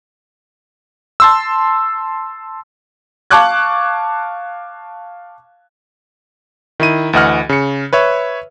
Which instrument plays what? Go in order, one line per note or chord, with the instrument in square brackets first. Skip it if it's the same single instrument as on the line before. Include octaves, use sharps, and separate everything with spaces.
[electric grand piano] A5 C6 E6
[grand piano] F5 A5 C#6 D6 F#6 G#6
[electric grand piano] D#3 E4 D#7
D2 E3 D#5 F#5 F6
C#3 C#7
B4 C#5 E5